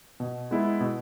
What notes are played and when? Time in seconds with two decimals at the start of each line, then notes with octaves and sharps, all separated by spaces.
0.20 B2
0.51 G#3 B3 E4 G#4
0.81 B2